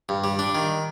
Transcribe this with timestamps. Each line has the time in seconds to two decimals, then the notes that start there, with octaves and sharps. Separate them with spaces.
0.09 G2
0.24 G3
0.39 D4
0.55 D#3